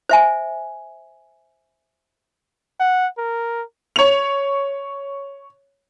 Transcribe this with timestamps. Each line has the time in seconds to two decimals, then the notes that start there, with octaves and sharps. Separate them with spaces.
0.09 C5 E5 G#5
2.80 F#5
3.18 A#4
3.96 C#5 F7